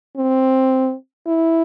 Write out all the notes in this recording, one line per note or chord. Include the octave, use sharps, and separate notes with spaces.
C4
E4